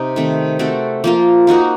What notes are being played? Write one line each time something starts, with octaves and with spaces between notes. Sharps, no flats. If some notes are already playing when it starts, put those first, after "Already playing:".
Already playing: C3 D#4
D#3 A3 C4
A3 C4 F#4 A4
F3 A#3 F4 A#4
A#3 D#4 F#4 A#4